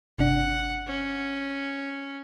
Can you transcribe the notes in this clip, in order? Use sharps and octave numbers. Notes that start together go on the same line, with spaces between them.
G1 C3 D4 F#5
C#4